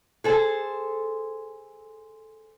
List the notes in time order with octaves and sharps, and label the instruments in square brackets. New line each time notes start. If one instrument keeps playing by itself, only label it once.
[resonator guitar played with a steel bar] G#4 A4 C5